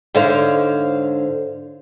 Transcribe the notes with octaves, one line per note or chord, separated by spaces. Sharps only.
G#2 D3 C5 C#5 F5